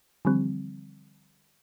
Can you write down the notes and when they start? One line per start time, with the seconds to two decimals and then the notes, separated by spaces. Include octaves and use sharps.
0.25 D3 E3 F3 G3 C4